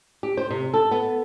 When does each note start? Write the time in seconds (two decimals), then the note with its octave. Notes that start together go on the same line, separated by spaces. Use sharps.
0.23 G4
0.37 C5
0.50 C3
0.74 A4
0.91 B3